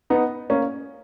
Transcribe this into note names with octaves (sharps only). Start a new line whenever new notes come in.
B3 D#4
A#3 C#4